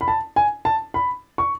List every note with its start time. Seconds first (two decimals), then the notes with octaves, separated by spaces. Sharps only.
0.01 B5
0.08 A5
0.36 G#5
0.65 A5
0.94 B5
1.38 C#6